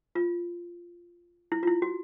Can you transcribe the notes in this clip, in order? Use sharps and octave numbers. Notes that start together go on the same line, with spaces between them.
F4
E4
F4
E4
F#4